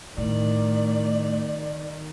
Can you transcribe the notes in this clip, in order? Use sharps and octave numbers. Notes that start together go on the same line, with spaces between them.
A2 D#3 D5